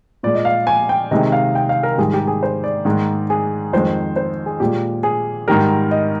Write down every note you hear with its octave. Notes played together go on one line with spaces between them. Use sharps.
A#2 G#3 D5
D#5
F5
G#5
G5
C3 D#3 G#3 D#5
F5
G5
F5
A#4
G#2 D#3 G3 G#4
G4
G#4
C5
D5
G#2 D#3 G#3
G#4
F2 D#3 G#3 C5
C5
G#4
A#2 G#3 G4
G#4
G#2 D#3 G3 A#4
D#5